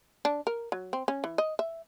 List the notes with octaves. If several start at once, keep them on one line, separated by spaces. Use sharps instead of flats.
D4
A#4
F#3
C4
C#4
E3
D#5
E5